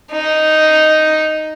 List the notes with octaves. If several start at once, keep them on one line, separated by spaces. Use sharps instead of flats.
D#4